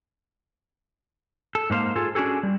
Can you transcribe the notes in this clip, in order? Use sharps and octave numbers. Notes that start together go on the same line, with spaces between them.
A4
G#2 A#3 C5 F5
F4 G#4 A4
C#4 D4 F#4 G#4 A4
G3